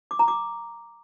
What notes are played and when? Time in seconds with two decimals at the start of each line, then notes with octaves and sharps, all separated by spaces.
0.11 D6
0.19 A#5
0.28 D6